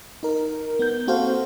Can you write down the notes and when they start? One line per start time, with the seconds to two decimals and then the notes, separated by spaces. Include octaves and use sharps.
0.23 D#4 A#4
0.79 B3 G6
1.07 A#3 C4 F#4 A4 C5 F5